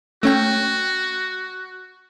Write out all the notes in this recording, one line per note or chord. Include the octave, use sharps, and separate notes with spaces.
A3 C#4 F#4 G5